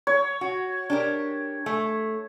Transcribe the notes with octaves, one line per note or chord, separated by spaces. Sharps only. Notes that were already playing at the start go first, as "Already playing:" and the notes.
C#5
F#4
D4 G4 A#4
A3